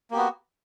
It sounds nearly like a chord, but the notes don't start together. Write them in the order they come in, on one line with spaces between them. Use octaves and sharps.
A#3 G4 B3 F#4